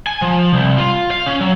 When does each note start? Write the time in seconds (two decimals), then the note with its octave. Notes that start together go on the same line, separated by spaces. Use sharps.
0.07 G#5
0.22 F3
0.54 C2
0.78 F4
1.11 F5
1.26 C#4
1.41 F#3